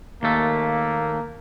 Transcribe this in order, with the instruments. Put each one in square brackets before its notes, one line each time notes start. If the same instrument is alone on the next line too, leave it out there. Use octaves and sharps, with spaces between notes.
[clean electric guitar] D#2 A3 [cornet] A#3